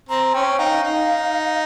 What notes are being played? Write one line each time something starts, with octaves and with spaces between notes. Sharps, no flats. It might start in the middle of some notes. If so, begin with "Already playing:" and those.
C4 A#5
C#4 G5
D#4 F5
D#4